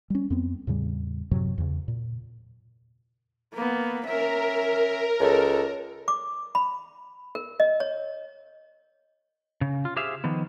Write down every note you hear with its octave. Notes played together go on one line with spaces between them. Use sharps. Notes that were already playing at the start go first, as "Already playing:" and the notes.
G3 C#4
F2 B3 C4
E2 A2 C#3 G3
F#2 A2 C3 F#3
E2 C#3
A#2
A#3 B3
C#4 A#4 E5
C#2 A4
D6
B5
A#4
D#5
C#5
C#3
F4
G4 G#4 C5 E5 F5
D#3 F3 B3